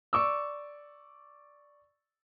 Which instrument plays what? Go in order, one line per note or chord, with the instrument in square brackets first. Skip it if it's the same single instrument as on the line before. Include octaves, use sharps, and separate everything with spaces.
[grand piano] D5 C#6 D6 E6